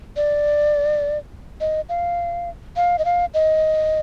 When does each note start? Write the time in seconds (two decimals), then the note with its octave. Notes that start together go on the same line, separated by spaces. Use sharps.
0.16 D5
1.61 D#5
1.89 F5
2.76 F5
2.99 D#5
3.05 F5
3.34 D#5